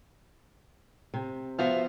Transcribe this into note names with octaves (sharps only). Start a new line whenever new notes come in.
C3
F3 B3 F#4 C5 E5 F5